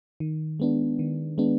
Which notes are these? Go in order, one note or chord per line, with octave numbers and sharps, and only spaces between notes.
D#3
G#3 B3 D4
D#3
G#3 B3 D4